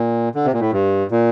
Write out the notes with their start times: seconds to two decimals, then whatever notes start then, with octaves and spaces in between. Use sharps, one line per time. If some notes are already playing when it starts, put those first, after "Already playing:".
Already playing: A#2
0.35 D3
0.45 C3
0.53 A#2
0.60 A2
0.72 G2
1.11 A#2